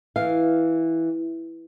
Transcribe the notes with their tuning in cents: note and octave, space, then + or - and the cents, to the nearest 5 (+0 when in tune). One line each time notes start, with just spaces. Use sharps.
E3 -5 F5 +0